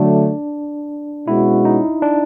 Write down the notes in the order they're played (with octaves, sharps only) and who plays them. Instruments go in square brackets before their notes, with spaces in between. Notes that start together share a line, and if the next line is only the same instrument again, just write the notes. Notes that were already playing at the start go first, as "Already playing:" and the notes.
Already playing: [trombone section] D3 F#3 A3 [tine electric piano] D4
[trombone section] B2 G#3 C#4 F#4 [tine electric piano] E4
[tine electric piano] D#4
D4